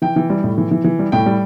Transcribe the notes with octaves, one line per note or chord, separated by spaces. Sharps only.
E3 G5
E3
G3
A2
E3
E3
E3
G3
A2 G5
G3